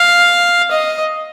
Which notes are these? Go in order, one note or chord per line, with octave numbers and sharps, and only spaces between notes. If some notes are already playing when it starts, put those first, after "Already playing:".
Already playing: F5
D#5